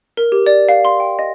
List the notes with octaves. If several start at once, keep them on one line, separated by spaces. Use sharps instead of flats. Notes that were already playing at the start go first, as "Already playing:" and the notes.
A#4
G4
D5
F5
C6
G5
D#5